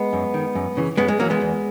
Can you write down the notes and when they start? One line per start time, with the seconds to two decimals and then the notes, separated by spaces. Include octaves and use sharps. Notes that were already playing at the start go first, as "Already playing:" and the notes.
Already playing: G#3 B3
0.13 F#2
0.34 D#3
0.55 F#2
0.77 C#3 E3
0.97 F#2 G#3 B3
1.08 G#3
1.19 C#3 E3 F#3 A#3
1.30 G#3 B3
1.41 E2